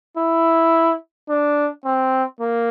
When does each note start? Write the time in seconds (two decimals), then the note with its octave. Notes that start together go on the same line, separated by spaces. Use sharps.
0.17 E4
1.29 D4
1.85 C4
2.40 A#3